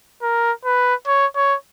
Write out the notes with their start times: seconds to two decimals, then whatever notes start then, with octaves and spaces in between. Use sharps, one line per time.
0.22 A#4
0.65 B4
1.07 C#5
1.36 C#5